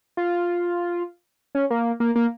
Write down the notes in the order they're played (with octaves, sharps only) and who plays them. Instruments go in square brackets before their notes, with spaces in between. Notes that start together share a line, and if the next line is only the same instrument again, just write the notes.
[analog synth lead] F4
C#4
A#3
A#3
A#3